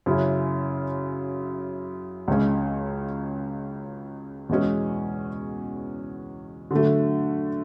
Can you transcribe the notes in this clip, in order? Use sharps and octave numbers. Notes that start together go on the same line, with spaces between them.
F#2 C#3 F#3 C#4 E4
C#2 C#3 G#3 C#4
E2 B2 G#3 C#4
D3 F#3 A3